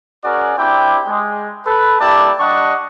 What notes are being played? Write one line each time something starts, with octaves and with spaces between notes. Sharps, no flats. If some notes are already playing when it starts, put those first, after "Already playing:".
C#4 F#4 G#4 A#4 D5
C4 D4 E4 G4 G5
G#3
A4 B4
A#3 E4 G4 D5 A5
G3 D4 D#5 F#5 C#6